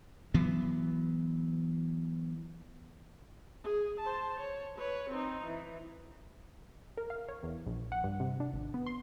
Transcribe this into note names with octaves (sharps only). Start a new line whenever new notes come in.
E3 F#3 B3
G#4
C5 A5
C#5
B4 C#5
C4 D#4
E3
A#4
F5
C#5
E2
A#1
F#5
G2
C3
D4
G#1
B3
C6